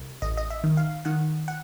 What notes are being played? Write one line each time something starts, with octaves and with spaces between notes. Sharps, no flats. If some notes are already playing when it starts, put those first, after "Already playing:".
Already playing: C2
A1 D#5
D#5
E5
D#3
F5
D#3 F#5
F#5